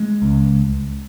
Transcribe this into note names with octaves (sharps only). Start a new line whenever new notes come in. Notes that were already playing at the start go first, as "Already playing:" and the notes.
Already playing: G#3
C#2